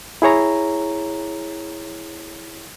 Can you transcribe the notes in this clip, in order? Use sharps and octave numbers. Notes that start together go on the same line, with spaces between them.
E4 G#4 C#5 A#5